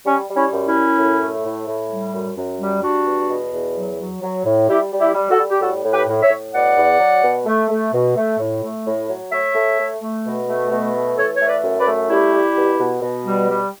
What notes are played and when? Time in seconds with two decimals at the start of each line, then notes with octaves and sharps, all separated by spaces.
0.06 G3 C#4
0.29 G3
0.36 C#4 E4
0.52 F#2
0.67 C#4 E4
0.74 F#2
0.98 A2
1.21 A3
1.45 A2
1.67 A2
1.91 G3
2.14 F#2
2.36 F#2
2.61 G3
2.83 G3 D4 F#4
3.06 E2
3.30 B2
3.53 E2
3.76 F#3
4.00 F#3
4.22 F#3
4.45 A2
4.69 G3 E4 G4
4.92 G3
4.99 E4 G4
5.14 G3
5.30 F#4 A4
5.39 G3
5.50 G4
5.61 A2 F#4 A4
5.85 A2
5.92 G4 B4
6.08 A2
6.22 C#5 E5
6.30 A2
6.54 B2 D5 F#5
6.77 E2
7.00 F#3
7.23 B2
7.46 A3
7.69 A3
7.93 B2
8.16 A3
8.39 A2
8.63 A3
8.86 A2
9.09 F#3
9.32 A3 C#5 E5
9.55 A3
9.79 A3
10.02 A3
10.25 B2
10.47 A3
10.71 B2
10.94 A3
11.18 E3 A4 C#5
11.36 A3 C#5
11.48 B4 D5
11.64 F#2
11.79 B4 D5
11.86 A3
12.09 G3 E4 G4
12.33 G3
12.57 B2
12.79 B2
13.02 B2
13.26 G3
13.50 G3